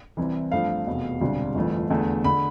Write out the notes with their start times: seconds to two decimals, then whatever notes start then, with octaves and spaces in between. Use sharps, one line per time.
0.17 C2 C3 E3
0.52 G2 F3 A3 C4 F5
0.87 F1 E2 B2
1.20 E1 D2 C3 G3 D4
1.55 G1 F2 E3 A3
1.90 E2 D3 A3
2.24 D3 B5